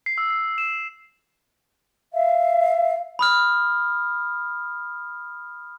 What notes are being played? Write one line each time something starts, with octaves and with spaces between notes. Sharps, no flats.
C7
E6
C7
E7
E5 F5
B5 D#6 F6